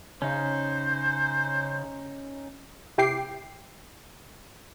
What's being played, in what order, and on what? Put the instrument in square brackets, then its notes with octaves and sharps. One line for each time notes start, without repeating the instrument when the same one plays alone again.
[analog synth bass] C#3 [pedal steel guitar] C#4 D#4 [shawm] C5
[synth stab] C3 E4 G4 G5 D6 C7